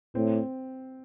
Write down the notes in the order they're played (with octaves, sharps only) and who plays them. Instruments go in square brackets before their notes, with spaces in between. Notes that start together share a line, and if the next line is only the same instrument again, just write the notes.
[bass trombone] A2 [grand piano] C4